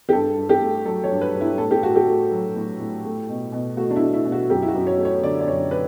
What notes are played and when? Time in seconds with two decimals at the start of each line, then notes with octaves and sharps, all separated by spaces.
0.09 G4
0.13 G2 A4
0.38 G2
0.49 G4
0.62 A3
0.85 F#3 A4
1.04 C#5
1.10 G2
1.21 B4
1.35 G2
1.41 E4
1.58 A2 A4
1.71 G4
1.83 A2 F#4
1.96 G4
2.07 A3
2.31 F#3
2.56 A2
2.80 A2
3.04 A3
3.29 B2
3.52 B2
3.77 A3 F#4
3.91 D4
3.96 A3 E4
4.14 E4
4.25 B2
4.32 F#4
4.50 F#2 G4
4.62 E4
4.68 F#4
4.75 F#2
4.87 C#5
4.98 A3
5.05 C#5
5.23 D3 D5
5.40 D5
5.48 F#2 C#5
5.71 B4